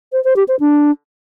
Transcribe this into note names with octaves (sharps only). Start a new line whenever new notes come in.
C5
C5
G4
C5
D4